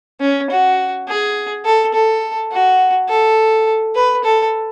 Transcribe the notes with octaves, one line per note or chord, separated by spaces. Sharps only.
C#4
F#4
G#4
A4
A4
F#4
A4
B4
A4